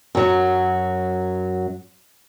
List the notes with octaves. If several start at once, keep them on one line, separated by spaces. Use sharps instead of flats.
F#2 F#3